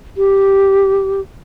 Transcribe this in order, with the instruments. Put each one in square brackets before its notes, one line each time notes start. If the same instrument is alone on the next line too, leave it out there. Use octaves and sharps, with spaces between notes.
[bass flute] G4